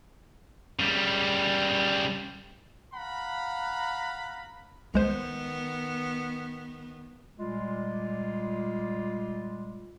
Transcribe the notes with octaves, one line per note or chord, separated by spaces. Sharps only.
C#3 G3
F5 F#5 A#5 B5
C2 D#3 G#3 B3 C5
A#2 G3 G#3 F4